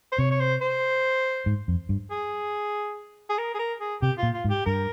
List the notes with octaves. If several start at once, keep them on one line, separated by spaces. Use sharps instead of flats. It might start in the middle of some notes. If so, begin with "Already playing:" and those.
C5
C3 C#5
C#5
C5
C5
G#2
F2
G2
G#4
G#4
A#4
G#4
A#4
G#4
C3 G4
A#2 F4
F4
G#2
G4
G2 A#4